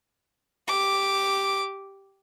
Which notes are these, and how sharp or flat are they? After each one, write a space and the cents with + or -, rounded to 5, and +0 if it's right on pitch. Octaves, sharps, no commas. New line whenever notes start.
G4 +0 D6 +0